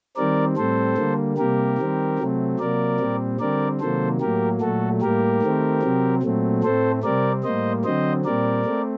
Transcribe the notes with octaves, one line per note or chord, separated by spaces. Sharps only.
D#3 G3 C4 A#4 D5
A2 G3 C4 A4 C5
D3 G3 A#3
C3 G3 A#3 G4 A#4
D#3 G3 C4
C3 F#3 A3 C4
C3 F#3 A#3 A#4 D5
A#2 G3 C4
D3 G3 C4 A#4 D5
C3 D#3 F#3 A#3 A4 C5
A2 F#3 A#3 G4 A#4
A#2 F#3 A3 F#4 A4
A2 G3 A#3 G4 A#4
D#3 A3 C4
C3 F#3 C4
A#2 F#3 A3 C4
A2 A3 C4 A4 C5
C3 G3 C4 A#4 D5
A2 G3 A#3 C5 D#5
D3 F#3 C4 C5 D#5
A#2 G3 C4 A#4 D5
A3 C4